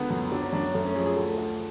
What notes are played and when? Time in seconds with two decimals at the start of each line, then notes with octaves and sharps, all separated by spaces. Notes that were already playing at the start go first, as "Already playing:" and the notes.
Already playing: C#2 D3 B3
0.10 F#2
0.32 F#3 D4
0.42 C#4
0.53 F#2 D4
0.74 F#2 A3
0.85 C#4
0.96 F3 G#4
1.06 G#4
1.16 D2 A4
1.38 D2